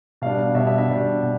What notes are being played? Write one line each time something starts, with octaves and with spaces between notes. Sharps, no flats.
B2 G3 D4 F5
F5
B2 G3 D4 E5
E5
E5
B2 G3 D4
B2